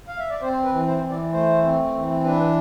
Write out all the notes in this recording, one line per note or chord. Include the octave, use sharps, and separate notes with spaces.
F5
E5
D5
C4 C5
B4
E3
C5
E3
D5
A3 C5
C4
E3
D4 B4